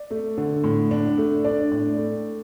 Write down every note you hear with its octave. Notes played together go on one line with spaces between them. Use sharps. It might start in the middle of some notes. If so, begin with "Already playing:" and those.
Already playing: D5
A3
D3
A2
D4
A3
D4 D5
A2
A3